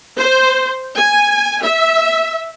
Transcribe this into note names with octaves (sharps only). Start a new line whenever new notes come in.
C5
G#5
E5